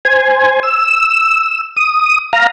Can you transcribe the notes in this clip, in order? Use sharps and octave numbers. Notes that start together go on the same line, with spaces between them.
C5 G#5
E6
D#6
F5 A#5